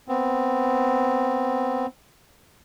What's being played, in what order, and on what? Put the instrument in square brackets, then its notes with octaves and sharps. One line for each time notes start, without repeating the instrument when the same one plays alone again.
[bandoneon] B3 C4